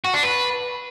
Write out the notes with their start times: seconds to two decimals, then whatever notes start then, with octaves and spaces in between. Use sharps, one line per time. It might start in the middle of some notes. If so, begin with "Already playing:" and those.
0.04 F#4
0.14 D4
0.23 B4